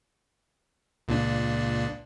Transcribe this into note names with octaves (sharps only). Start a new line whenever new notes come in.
C#2 A#2 D4